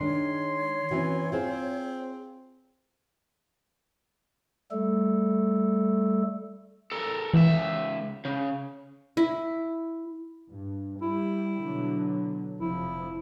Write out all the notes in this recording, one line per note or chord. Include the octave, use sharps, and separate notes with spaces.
D#3 G#3 D4 C#5 C6
E3 C4 C#4 F#4
C4 F4 G#4 C5
G3 A3 A4
A4 A#4
C#2 E3 E5
C#3
E4
G2
G3 E4
B2 D3 F#3
F1 F3 E4